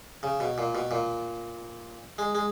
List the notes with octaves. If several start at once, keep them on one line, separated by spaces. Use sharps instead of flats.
C#3
B2
A#2
B2
A#2
G#3
G#3